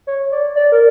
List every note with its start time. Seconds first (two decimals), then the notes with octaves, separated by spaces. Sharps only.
0.07 C#5
0.32 D5
0.56 D5
0.72 A#4